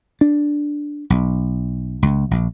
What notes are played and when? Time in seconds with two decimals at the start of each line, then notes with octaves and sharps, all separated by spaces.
0.21 D4
1.10 B1
2.02 C#2
2.31 A#1